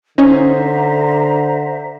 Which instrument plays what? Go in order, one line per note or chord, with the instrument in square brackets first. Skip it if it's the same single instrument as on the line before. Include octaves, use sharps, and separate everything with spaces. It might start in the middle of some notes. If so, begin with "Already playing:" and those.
[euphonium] D3 [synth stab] C#4 D#4 [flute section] C5 E5 A#5